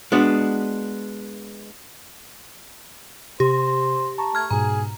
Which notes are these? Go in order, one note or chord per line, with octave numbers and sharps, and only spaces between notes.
G#3 B3 D4 F#4
C3 G4 C5
A5 A#5 C#6
A3 F6 G#6
G#2 B2 G#4 A#5